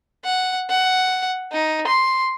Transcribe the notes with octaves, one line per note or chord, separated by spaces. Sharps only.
F#5
F#5
D#4
C6